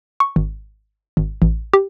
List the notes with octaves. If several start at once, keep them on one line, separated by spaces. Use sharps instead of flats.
C#6
G#1
G#1
A1
G4